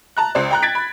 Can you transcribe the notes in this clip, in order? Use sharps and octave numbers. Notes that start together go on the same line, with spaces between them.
A5 A#5 F#6
C#2 C5 D5
G5 A#5 F#6
G#6 A6 B6 D7
B5